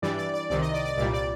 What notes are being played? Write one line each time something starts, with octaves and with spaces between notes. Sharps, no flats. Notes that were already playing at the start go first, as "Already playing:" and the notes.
G2 E3 G3 D5
D5
D5
C2 C3 D#3 D5
D#5
D5
D5
C2 A#2 G3 D5
D5